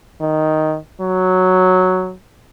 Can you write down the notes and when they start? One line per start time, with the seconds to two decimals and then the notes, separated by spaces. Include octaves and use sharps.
0.21 D#3
1.01 F#3